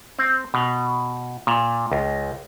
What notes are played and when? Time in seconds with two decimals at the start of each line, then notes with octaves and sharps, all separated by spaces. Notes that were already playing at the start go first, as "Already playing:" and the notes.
0.19 C4
0.54 B2
1.47 A#2
1.92 C#2